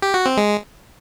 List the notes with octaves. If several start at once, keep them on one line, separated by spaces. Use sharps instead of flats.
G4
F#4
C4
G#3